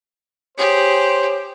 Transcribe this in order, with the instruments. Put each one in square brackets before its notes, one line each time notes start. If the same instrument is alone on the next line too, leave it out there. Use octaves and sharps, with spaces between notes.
[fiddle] G4 G#4 [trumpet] C5 [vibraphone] C#5